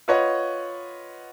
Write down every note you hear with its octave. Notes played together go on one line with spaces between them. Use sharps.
F4 B4 C#5 D#5 F#5